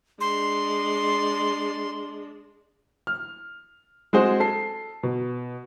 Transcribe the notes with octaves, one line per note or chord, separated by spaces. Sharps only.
G#3 D4 C6
F6
G#3 C4 F#4 G#4 C5
A4 C7
B2